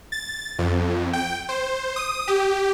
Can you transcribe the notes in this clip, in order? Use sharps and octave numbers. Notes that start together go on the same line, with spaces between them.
A6
F2
G5
C5
D#6
G4